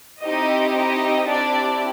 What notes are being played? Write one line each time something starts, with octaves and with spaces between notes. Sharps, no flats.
C4 D#4 E4 G4 D#5
D#4 D#5
C4 D4 E4 G4 D5